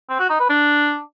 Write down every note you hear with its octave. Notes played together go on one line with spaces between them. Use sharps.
C4
F#4
D#4
B4
D4